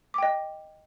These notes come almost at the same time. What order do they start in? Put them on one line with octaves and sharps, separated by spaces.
D6 G5 D#5